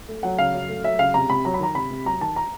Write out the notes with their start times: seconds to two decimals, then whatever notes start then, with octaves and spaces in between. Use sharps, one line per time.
0.09 A3
0.23 F#3 F#5
0.38 C#3 F5
0.54 F#2
0.69 A3
0.84 F#3 E5
0.99 C#3 F5
1.14 C3 A#5
1.30 C3 B5
1.45 F#3 A#5
1.54 B5
1.60 D#3 A#5
1.75 C3 B5
1.91 C3
2.05 F#3 A#5
2.21 D#3 A5
2.36 A#5